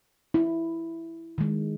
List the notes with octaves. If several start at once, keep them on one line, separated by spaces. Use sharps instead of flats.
E4
D#3 G#3